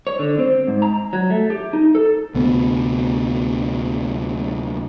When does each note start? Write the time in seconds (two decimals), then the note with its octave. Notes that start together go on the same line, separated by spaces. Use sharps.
0.07 C#5
0.19 D3
0.39 C4
0.67 G#2
0.82 A#5
1.13 F#3
1.30 A3
1.50 G4
1.73 D#4
1.95 A4
2.35 D2 C3 B3